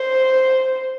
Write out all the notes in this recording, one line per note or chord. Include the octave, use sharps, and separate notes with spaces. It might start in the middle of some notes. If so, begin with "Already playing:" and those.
Already playing: C5